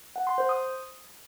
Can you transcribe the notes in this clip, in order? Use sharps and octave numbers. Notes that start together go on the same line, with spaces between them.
F#5
C6
C5
D#6